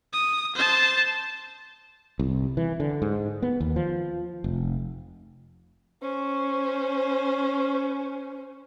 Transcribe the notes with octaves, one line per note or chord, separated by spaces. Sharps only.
D#6
C5 A5
C2
E3
D3
G#2
B3
D#2
F3
F1
C#4 C5